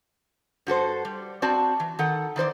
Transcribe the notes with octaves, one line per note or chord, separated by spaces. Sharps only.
G2 F#4 A4 C5
G3
C4 F#4 D5 A5
E3
D#3 A4 F#5
D#3 E3 C5 D5